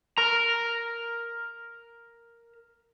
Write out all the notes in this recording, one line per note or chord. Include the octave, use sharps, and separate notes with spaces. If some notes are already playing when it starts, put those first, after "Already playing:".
A#4 A#5